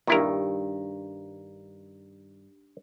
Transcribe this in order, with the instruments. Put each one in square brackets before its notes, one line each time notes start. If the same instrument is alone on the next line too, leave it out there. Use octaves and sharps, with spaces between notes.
[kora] G2 D#3 [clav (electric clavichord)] A#2 E4 A#4